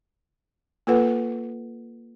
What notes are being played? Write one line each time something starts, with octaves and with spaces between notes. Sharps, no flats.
A#3 F4 A4 B4 F#5